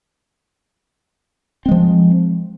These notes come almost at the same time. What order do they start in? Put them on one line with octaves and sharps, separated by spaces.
C4 G#3 F3